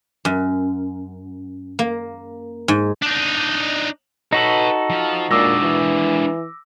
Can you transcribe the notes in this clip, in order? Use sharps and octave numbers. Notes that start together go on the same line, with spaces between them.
F#2
A#3
G#2
D4 D#4
D#4 F#4 A4 B4 C#5 A#6
F3
A#2 G#3 D4 D6 E6 A#6
E3